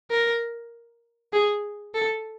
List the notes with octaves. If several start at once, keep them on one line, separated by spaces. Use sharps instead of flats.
A#4
G#4
A4